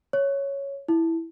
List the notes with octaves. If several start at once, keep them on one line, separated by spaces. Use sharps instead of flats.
C#5
E4